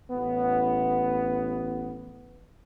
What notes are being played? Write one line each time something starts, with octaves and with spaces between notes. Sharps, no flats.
A1 B3